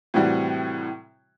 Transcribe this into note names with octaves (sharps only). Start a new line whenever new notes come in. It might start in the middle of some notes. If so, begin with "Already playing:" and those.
A2 C3 E3 G3 F#4